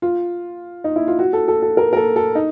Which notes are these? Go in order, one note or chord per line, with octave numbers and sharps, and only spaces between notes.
F4
D#4
E4
F4
F#4
A4
A4
A4
A#4
A#4
A4
A4
D#4